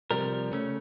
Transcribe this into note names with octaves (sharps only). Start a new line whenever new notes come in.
C3 F3 G3 A#4
C#3 A3 C#4